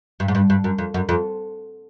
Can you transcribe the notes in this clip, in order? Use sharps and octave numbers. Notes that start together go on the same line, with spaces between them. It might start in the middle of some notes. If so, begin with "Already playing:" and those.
G2
G#2
G2
G2
F#2
F2
F#2
F2